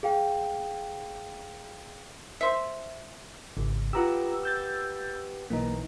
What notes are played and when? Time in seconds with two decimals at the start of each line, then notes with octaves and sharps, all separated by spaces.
0.03 G#4 F5 G5
2.41 C5 E5
3.57 G#1 C#3
3.93 F4 G4 B4 F#5 A#5 E6
4.43 E6 G6 A6
5.50 B1 E3 A#3 D#4